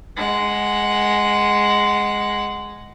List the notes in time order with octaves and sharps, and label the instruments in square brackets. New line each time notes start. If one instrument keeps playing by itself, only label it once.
[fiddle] G#3 F#5